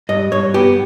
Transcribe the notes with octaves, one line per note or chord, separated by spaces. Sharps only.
G2 D#5
G2 C#5
B3 G4